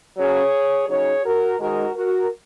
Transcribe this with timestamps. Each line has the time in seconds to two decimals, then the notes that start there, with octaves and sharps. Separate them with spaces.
0.17 C#3 F#3 C#4 G#4 C#5
0.88 C#3 F#3 D#4 G#4 C#5
1.24 F#4 A#4
1.59 G#2 D#3 G#3 D#4 F#4 A#4
1.94 F#4 A#4